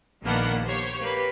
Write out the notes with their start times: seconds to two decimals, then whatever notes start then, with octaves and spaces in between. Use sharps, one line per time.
0.23 A#1 D#3 A#3 B3 D4 F#5
0.63 G4 C5 C#5
1.01 A#3 G4 B4